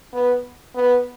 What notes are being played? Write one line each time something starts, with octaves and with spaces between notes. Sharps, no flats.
B3
B3